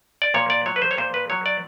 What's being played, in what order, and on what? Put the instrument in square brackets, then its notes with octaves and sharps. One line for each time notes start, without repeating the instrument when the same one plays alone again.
[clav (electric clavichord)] D5
A#2 C#5
D5
F#3 C#5
B4
C5
C#5
A#2 C5
B4
F#3 C#5
D5